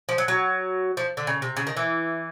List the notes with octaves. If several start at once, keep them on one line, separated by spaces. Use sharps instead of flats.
F3
F#3
F#3
F3
D3
C#3
C3
C#3
D#3
E3